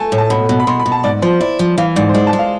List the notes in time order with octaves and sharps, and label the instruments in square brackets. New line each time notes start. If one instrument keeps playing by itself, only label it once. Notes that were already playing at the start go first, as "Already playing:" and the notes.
Already playing: [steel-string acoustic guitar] A3 [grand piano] G#5 A5
[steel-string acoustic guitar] A2
[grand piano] A5
[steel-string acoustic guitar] B2 [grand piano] B5
[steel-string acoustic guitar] B2
[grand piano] B5
[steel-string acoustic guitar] B2 [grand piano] C6
[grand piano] B5
[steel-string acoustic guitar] B2
[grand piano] A5
[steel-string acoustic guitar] G#2 [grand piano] D5
[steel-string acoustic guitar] F3 [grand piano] C5
[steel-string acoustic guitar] E4 [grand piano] D5
[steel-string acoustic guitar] F3
[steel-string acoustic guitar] E3 [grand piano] F5
[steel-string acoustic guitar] G#2 [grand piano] D5
[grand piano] C5
[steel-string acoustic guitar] G#3 [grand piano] D5
[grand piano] A5
[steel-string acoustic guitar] G#3
[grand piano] F5